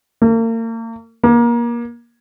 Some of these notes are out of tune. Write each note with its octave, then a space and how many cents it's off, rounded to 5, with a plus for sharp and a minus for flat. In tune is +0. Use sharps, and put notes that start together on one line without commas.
A#3 -40
A#3 +25